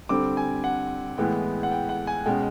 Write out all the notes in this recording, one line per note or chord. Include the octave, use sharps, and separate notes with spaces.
D3 G3 C4 D6
G#5
F#5
A2 E3 G#3 B3 G5
F#5
G5
F#5
G#5
B2 G#3 C#4 G5